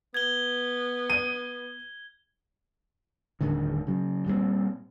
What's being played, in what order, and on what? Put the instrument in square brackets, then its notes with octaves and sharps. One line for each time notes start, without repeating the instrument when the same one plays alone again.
[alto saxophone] B3 [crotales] G#6 G7
[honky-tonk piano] D#7
[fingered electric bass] D#1 A2 D3 D#3
C#3 F#3
A#2 G3 A3 C4